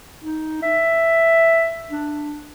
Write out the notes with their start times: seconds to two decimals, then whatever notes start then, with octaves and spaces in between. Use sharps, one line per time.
0.24 D#4
0.62 E5
1.90 D4